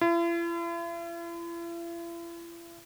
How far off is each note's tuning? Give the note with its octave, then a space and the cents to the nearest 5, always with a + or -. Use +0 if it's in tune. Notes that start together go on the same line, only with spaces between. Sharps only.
E4 +45